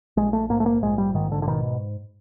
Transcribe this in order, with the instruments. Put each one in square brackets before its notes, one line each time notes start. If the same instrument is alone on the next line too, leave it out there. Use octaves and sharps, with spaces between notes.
[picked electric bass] A#1 G#3
A3
G#2 A#3
A3
A#3
A#1 G#3
G3
G#2 D#3
D3
D3
B2 D#3